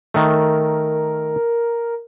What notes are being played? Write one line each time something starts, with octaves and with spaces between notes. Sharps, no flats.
D#3 A3 A#4